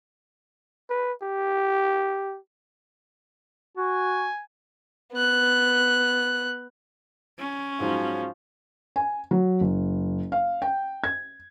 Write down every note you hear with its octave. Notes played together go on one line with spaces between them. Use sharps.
B4
G4
F#4 G#5
B3 F#6
C#4
G#2 F3 F#3
G#5
F#3
F#1
F5
G5
G#6